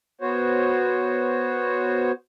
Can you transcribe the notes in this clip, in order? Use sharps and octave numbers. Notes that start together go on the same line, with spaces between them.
B3 F#4 C5 C#5